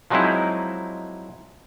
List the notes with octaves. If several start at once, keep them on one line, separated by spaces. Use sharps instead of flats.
F3 F#3 G#3 C4 D#4 E4